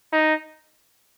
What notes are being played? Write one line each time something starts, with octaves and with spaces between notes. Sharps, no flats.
D#4